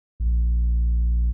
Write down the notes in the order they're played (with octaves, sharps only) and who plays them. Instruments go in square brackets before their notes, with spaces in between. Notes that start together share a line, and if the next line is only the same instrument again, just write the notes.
[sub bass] A#1